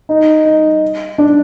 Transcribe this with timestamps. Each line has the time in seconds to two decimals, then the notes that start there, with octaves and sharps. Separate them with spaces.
0.09 D#4
0.45 D#4
1.18 D4